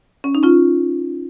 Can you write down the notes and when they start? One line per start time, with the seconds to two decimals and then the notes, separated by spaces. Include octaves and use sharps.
0.24 C#4
0.35 D#4
0.43 C#4 F4